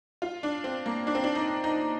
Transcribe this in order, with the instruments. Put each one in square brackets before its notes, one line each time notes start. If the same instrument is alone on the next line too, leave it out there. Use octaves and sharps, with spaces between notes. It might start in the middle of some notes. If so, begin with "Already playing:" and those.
[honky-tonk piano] F4
D4
C4
A#3
D4
C4
D4
D#4
D#4